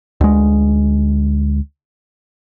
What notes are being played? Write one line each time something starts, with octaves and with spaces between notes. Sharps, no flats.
D2 G#3